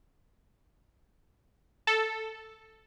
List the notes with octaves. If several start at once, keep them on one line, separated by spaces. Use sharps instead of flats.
A4